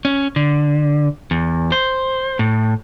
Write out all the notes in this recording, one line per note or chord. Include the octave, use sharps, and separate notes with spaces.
C#4
D3
E2
C5
A2